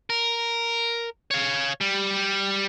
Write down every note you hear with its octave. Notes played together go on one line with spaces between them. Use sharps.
A#4
C#5 F5
G3